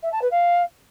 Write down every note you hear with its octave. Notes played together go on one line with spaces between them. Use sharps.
E5
A5
B4
F5